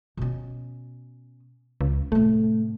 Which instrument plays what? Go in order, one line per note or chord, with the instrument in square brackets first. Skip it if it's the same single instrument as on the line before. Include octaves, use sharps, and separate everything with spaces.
[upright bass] B2 C#4
[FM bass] C#2
[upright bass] A2 C3 [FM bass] A3